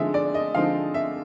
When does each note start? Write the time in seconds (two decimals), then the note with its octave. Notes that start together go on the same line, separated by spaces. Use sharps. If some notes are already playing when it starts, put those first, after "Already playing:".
Already playing: D3 F3 G#3 C4 D#4 E5
0.14 D5
0.34 D#5
0.54 D3 F3 G#3 C4 D#4 F5
0.94 E5